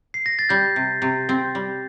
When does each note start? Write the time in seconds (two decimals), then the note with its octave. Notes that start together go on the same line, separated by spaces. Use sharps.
0.14 C7
0.26 A#6
0.39 A6
0.49 G3 G6
0.76 C3
1.02 C3
1.29 C4
1.55 G3